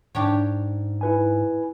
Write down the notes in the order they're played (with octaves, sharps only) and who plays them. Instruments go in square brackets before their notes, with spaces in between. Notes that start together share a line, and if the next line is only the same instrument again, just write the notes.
[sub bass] G#2 [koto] D4 G4 C#5
[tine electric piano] E4 B4 G#5